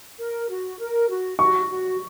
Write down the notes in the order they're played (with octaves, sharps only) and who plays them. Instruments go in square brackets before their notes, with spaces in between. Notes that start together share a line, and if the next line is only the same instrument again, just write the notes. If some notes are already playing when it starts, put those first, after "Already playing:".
[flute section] A#4
F#4
A#4
F#4
[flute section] F#4 [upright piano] C#6
[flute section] F#4